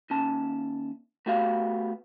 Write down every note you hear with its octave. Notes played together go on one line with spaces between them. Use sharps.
D#2 C#4 A5
A3 B3 F#4 G4 F5